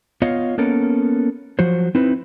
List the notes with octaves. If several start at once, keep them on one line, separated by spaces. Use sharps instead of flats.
B3 F4 C#5 D#5 F5
A#3 B3 C#4 A4 A#4
F3 F#3 F#4 C5
C4 D#4 E4 B4